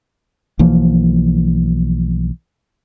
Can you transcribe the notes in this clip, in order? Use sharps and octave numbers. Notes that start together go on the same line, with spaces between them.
B1 E3 F3 A#3